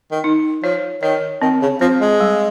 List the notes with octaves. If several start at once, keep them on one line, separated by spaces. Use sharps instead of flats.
D#3
D#4
F3 C#5
D#3 C#5
D#3 C4
C#3
F3 C4
G#3
G3